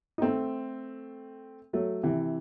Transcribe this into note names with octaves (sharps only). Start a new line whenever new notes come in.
D#4
A3 C4
F#3 A3
C3 E3